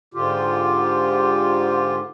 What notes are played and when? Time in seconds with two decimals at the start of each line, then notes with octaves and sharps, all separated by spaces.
0.14 G#2 D3 F4 G4